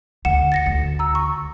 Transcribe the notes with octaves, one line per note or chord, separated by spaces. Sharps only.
D2 F#5 C#7 E7
A6 A#6 C#7
D2
A#5 E6
C#6